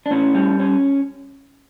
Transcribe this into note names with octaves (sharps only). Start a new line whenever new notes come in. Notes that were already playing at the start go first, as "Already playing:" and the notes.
D4
A2 C#4
G3
C#4